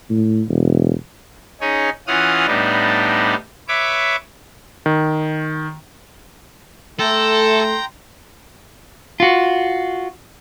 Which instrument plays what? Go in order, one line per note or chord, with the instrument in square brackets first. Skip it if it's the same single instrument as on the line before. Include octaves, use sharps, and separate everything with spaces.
[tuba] A2
E1
[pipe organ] C#4 D#4 G#4 C#5
E3 C#4 F4 F#5 D#6 F6
A2 G3 B3 D4 D#4
B4 C#5 E5 D6
[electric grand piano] D#3
[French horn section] A3 [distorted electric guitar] A4 [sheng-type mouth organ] G5 A#5 [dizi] C6
[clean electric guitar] F4 F#4